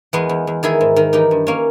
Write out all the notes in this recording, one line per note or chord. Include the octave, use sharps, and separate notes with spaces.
E2 G#3 B3
E2
E2
D#3 E4 G#4
G#2
D#3
E3 D#4 G4
G2
A#3 C#4